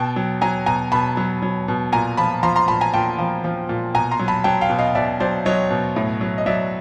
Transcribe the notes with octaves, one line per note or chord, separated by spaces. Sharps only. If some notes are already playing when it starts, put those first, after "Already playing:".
Already playing: B2 G5 A5
F#3
F#3 G#5 A#5
B2 G#5 A#5
B2 A5 B5
F#3
F#3
B2
A#2 G#5 A#5
F3 A5 B5
F3 A#5 C6
A#5 C6
A#2 A5 B5
G#5 A#5
A#2 G5 A5
F3
F3
A#2
B2 G#5 A#5
A#5 C6
F#3
A5 B5
F#3 G5 A5
F5 G5
B2
D#5 F5
B2 D5 E5
F#3 C5 D5
F#3 C#5 D#5
B2
A2
F#3
D#5
F#3 D5 E5